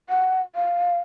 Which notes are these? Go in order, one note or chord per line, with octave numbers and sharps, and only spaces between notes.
F#5
F5